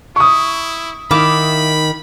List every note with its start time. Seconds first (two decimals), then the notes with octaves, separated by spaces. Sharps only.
0.16 E4 C#6 D#6
1.11 D#3 E4 F5 B5 D6